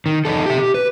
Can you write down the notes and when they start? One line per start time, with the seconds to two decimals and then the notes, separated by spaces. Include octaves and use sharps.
0.06 D#3
0.25 E2 D#4 A4
0.46 G4 E5
0.58 G4
0.74 B4